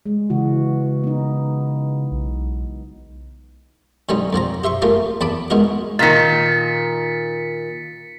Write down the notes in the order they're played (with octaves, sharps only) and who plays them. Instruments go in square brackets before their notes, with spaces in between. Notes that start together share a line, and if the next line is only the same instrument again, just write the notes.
[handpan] G#3
[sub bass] C#3 [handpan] E3 F#4
[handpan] B3 D#4
[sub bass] B1
[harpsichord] D3 F#3 G3 C4 C#4 D#4
F2 F3 C4 A#5
G4 E5 C6 C#6
A3 A#3 C#4 F4 G4
E2 A5 B5 D6
B2 G#3 D#4 F#4 A#4
[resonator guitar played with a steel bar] A#2 D#3 [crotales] A6 B6 C#7